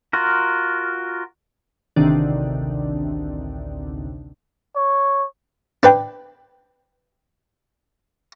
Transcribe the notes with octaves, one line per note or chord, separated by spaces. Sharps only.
F4 F#4 A#4
A1 D2 C3 D#3 D4
C#5
D4 B4 G5